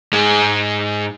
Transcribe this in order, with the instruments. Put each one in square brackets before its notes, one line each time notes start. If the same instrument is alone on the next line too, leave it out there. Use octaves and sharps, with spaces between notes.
[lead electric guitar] G#2 G#3